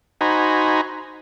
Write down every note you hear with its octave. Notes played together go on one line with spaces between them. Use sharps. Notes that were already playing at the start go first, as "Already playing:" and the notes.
D#4 F#4 C5 G#5 A#5 B5